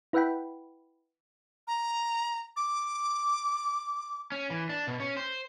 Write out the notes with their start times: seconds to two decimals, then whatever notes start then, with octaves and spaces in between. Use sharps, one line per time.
0.13 E4 B4 E5 F#5 G5 B5
1.67 A#5
2.56 D6
4.32 C#4
4.50 E3
4.70 D4
4.87 B2
5.00 C#4
5.17 C5